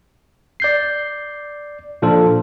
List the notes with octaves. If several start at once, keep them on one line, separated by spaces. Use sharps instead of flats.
D5 G6 C7
A#2 F3 D4 F4 A4